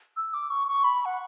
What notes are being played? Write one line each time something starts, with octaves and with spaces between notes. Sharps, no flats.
E6
D6
C#6
C#6
B5
F#5